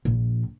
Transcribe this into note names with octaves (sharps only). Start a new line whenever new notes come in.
A#1